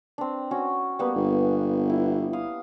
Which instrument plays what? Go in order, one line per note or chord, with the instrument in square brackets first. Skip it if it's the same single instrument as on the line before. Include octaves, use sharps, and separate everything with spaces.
[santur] C4 D4
C#4 F#4
G3 A#3 B3
[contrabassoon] G1
[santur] E4
F5 D#6